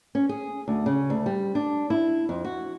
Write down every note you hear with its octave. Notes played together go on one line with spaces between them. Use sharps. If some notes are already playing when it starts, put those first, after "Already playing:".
C#4
G#4
D2
C#3
D2
G3
D4
E4
F2
F#4